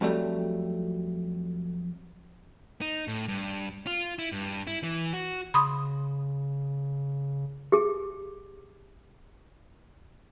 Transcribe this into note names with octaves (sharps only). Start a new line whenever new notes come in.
F2 F#3 G3 A3
D#4
A2
G2
F4
E4
G2
E4
E3
F#4
C#3 B5 C6 D#6
G4 G#4